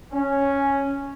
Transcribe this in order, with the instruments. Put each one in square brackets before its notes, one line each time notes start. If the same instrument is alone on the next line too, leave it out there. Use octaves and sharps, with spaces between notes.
[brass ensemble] C#4